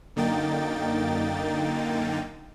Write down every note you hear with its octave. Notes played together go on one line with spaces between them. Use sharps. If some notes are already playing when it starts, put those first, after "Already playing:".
F#2 D3 A#3 D#4 G5 A6